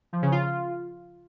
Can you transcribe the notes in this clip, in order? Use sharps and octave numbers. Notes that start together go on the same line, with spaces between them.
F3
C#3
F4